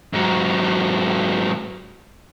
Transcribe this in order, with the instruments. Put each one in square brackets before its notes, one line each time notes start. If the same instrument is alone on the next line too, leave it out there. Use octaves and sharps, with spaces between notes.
[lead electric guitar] G#2 F#3